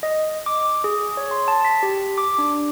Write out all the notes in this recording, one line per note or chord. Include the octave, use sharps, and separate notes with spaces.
D#5
D6
G#4
C#5
C6
A5
B6
G4
D6
D4